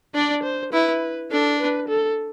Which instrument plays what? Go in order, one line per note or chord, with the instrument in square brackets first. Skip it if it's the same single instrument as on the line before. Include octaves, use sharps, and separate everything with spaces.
[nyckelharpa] D4 [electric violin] D5
[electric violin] C5
[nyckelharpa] E4 [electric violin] B4
[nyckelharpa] D4 [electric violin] A4
[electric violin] B4
A4